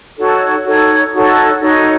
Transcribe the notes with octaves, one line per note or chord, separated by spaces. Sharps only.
D#4 F#4 A4 C#5
D#4 F#4 A4 C#5
D#4 F#4 A4 C#5
D#4 F#4 A4 C#5